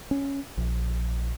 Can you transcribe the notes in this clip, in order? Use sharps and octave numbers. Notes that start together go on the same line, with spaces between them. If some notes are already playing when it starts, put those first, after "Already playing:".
C#4
A#1